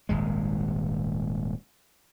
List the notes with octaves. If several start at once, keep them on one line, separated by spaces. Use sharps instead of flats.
D#1 G#1 G#3